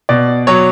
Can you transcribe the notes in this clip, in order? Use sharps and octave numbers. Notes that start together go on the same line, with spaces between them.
B2 D5
F#3 C#5